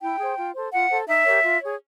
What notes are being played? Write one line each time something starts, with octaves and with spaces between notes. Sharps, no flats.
E4 G5
G#4 C5
F4
A4 C5
F4 F#5
A4 C5
D#4 E5
G4 A#4 C#5
F4
G#4 C#5